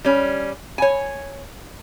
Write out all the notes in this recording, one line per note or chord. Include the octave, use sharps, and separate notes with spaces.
G3 C#4
C#5 G#5